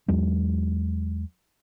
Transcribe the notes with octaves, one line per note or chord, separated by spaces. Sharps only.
E2 F#3 G#3